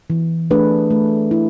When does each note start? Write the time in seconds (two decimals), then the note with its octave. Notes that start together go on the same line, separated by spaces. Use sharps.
0.10 E3
0.51 A3 D4 G#4 B4
0.91 A3
1.31 E4